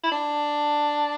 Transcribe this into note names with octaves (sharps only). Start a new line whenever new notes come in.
E4
D4